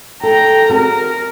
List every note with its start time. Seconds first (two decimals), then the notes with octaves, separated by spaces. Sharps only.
0.23 A4 G5 A#5
0.70 C4 F#4 G#4 A#4